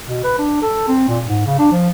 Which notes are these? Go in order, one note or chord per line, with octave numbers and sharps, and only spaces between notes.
B2
B4
D4
A4
C4
A#2
G#2
C#3
D4
F3